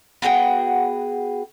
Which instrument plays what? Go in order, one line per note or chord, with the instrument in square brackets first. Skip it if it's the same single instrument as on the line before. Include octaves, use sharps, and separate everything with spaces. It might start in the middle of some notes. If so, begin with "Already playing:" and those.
[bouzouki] B3 F#4 G#4 G5